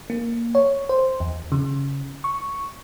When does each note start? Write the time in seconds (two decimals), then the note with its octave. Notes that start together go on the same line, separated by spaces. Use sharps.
0.10 A#3
0.55 C#5
0.89 C5
1.20 E2
1.52 C#3
2.24 C#6